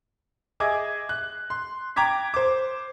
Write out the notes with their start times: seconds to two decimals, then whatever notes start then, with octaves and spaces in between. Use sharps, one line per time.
0.60 G#4 D#5 E5 D6 G#6
1.09 F#6
1.50 C6
1.96 G5 A#5 D6 G#6 B6
2.34 C5 D6